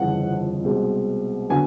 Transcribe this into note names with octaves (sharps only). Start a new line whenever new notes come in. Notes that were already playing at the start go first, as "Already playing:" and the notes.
Already playing: G1 F2 C#3 E3 F#5
C2 B2 G#3 C4
D3 F#3 B3 G#5